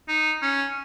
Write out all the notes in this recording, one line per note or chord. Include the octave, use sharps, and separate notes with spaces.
D#4
C#4